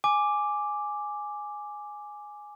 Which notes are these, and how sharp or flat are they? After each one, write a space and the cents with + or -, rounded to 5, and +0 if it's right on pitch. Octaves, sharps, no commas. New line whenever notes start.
G#5 +0 D6 +0